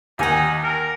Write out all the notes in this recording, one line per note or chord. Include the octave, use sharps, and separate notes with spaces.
D#2 D#4 F#5 G#5
A#4